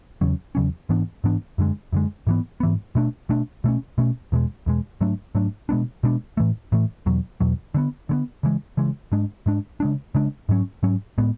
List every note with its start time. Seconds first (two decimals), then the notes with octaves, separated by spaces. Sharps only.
0.21 E2 C#3 F#3 C#4
0.55 E2 C#3 F#3 C#4
0.89 G#2 E3 B3 D4
1.24 G#2 E3 B3 D4
1.58 F#2 D3 G#3
1.93 F#2 D3 G#3
2.27 G#2 E3 B3
2.60 G#2 E3 B3
2.95 B2 A3 D4
3.29 B2 A3 D4
3.64 B2 A3 C#4
3.98 B2 A3 C#4
4.32 E2 B2 G#3
4.66 E2 B2 G#3
5.01 G#2 F#3 A3 D4
5.35 G#2 F#3 A3 D4
5.69 B2 G#3 B3 D4
6.03 B2 G#3 B3 D4
6.37 A2 E3 A3
6.72 A2 E3 A3
7.06 E2 B2 F#3
7.40 E2 B2 F#3
7.74 D3 G#3 B3
8.09 D3 G#3 B3
8.43 C#3 E3 G#3
8.77 C#3 E3 G#3
9.12 G#2 G#3 D4
9.46 G#2 G#3 D4
9.80 C#3 G#3 D4
10.15 C#3 G#3 D4
10.49 G#2 F#3 C#4
10.83 G#2 F#3 C#4
11.18 A2 G#3 B3